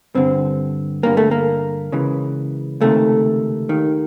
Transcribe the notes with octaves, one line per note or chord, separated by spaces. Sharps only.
G2 D3 C4
G2 D3 A#3
A3
A#3
C#2 C#3 E3
C#2 C3 D#3 A3
D#2 D#3